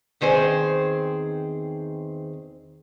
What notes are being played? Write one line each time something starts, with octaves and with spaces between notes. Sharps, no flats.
E2 D#3 C4 G#4 C5